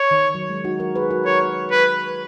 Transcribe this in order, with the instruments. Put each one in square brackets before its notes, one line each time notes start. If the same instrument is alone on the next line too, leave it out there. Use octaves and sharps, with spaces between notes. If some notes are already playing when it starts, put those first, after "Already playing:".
Already playing: [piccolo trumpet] C#5
[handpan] D#3
F#3
G#3
D#4 F#4
F#4 A#4
G#4 B4
F#4 A#4
[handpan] F#4 A#4 [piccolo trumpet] C#5
[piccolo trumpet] B4